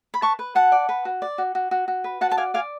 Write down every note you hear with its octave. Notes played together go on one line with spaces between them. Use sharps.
B5
B4 A5 C#6
B4
F#4 F#5 A5
D5
B4
F#4
D5
F#4
F#4
F#4
F#4
B4
F#4 F#5 A5
A5
D5 F5 G#5
D5 F5 G#5